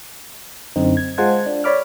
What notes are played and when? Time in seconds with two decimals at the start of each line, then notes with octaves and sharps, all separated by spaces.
0.76 F#2 D3 C4 D#4
0.97 G#6
1.18 G#3 F4 C5 F#5 A5 G#6
1.46 D4
1.64 C#5 D5 B5 D6 F6